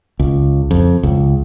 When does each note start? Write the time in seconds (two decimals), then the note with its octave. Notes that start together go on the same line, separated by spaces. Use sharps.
0.19 C#2
0.71 F2
1.03 C#2